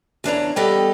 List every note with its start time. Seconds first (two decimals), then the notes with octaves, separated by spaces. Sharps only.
0.24 E2 D4 C#5 A#5
0.56 G3 B3 G4 A4 D#5